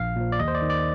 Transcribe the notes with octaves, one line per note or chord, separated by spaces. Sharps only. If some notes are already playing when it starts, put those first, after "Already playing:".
Already playing: A#1 F5
A#2 F3
D5
D#2 D#5
C5
D5
D#3
D5